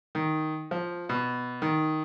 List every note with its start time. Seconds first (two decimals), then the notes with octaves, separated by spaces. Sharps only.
0.15 D#3
0.71 F3
1.09 B2
1.62 D#3